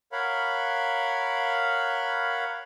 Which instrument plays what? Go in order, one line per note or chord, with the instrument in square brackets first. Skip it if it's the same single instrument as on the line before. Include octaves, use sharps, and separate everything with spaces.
[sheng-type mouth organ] A#4 C#5 F5 F#5 B5